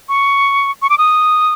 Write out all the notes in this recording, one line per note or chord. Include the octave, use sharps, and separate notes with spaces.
C#6
C#6
D6
D#6